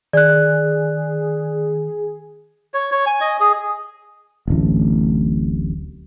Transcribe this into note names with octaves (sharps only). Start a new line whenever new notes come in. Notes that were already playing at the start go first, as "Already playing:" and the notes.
D#3 G#4 D5 F#6
C#5
C#5
G#5
D#5
G#4
D1 A1